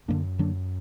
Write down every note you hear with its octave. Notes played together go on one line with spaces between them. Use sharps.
F#2 D3 F#3 A#3 D4
D3 F#3 A#3 D4